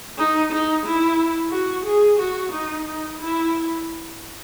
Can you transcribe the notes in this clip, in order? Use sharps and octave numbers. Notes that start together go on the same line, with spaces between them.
D#4
D#4
E4
F#4
G#4
F#4
D#4
D#4
E4